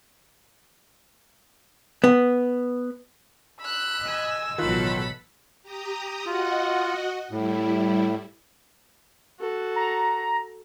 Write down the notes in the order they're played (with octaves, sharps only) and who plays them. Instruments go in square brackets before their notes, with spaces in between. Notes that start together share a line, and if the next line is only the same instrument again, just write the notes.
[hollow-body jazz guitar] B3
[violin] B5 F#6 [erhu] E6
[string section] D#5 G#5
[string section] A1 B2 F#3 [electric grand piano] D#3 F4 F#6 [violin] A4 B5
[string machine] G4 A#5 D#6
[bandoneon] F4 [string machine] F#4 D#5 F#5
[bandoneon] A2 [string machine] G3 E4
[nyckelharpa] F#4 A4
[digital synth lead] A#5